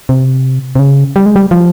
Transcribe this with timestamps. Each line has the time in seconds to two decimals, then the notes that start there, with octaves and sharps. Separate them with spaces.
0.09 C3
0.75 C3
0.79 C#3
1.16 G3
1.26 G#3
1.36 G3
1.51 F3